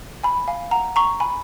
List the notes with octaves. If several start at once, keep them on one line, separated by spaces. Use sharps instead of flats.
G#5 B5
F5 G#5
F#5 A#5
A#5 C#6
G#5 B5